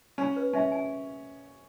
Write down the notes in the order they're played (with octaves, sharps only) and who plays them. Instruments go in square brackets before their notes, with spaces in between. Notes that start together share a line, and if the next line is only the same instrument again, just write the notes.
[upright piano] C#4 [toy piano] B5
[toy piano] B4
[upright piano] C#4 [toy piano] E5
[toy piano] G#5